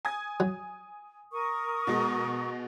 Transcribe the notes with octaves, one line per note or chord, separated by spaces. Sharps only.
G#5 D#6 G#6
F#3
A#4 C#6 D#6
B2 G#3